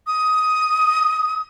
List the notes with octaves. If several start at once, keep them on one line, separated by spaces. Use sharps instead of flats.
D#6